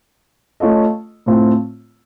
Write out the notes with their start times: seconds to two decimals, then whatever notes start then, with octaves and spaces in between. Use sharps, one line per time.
0.60 A3 C#4 F4 A4 D#5
1.26 A2 A3 C4 F4